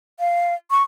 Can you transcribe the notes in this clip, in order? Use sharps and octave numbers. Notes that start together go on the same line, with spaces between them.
F5
C#6